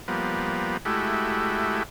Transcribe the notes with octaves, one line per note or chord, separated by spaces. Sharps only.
F3 G3 A#3 B3
G#3 A3 E4 F#4 G4